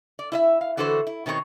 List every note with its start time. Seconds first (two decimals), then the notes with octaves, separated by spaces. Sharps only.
0.19 D5
0.32 E4 D#5 E5
0.61 F5
0.77 D3 E3 F#4 A4 B4 C5
1.07 E4
1.26 B2 D#3 C4 D4 C#5